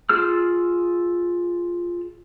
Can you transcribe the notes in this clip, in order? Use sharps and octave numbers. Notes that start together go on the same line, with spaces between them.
F4 G#4 E6 F6